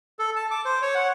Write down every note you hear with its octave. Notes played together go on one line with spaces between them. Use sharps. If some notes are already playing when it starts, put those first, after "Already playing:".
A4
A5
D6
C5
C#5
F#5